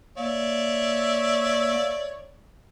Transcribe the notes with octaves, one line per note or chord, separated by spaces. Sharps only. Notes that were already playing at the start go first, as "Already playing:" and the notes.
A#3 C#5 D5 E5